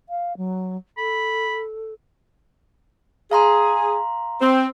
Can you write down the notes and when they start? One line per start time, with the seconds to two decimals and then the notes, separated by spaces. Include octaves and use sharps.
0.09 F5
0.37 F#3
0.97 A4 B5
3.31 G#4 F5 A#5 C6
4.41 C4